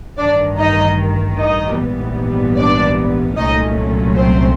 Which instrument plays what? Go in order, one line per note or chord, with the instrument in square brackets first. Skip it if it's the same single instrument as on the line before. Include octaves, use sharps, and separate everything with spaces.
[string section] A1 G2 D#3 D4 D5
D#4 D#5
D#4 D#5
A#1 G#2 E3 G3 B3
D4 D5
C2 A#2 F#3 A3 C#4 D#4 D#5
C4 C5